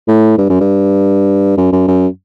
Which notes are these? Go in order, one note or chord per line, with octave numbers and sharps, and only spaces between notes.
A2
G2
F#2
G2
F#2
F#2
F#2